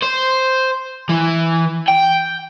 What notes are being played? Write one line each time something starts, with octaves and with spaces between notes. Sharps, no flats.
C5
E3
G5